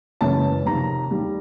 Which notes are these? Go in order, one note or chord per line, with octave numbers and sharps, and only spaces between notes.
F#1 F#2 C#3 E3 G#3 A5
F2 C3 D#3 A#5
D#2 D#3 G3